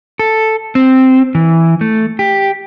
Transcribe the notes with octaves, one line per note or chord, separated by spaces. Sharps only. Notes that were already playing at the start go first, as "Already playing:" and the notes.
A4
C4
E3
A3
G4